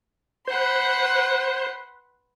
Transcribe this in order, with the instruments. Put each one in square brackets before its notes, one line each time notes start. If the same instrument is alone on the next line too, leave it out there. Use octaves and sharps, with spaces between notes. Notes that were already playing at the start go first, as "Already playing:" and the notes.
[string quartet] B4 F#5 C6 [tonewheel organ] C5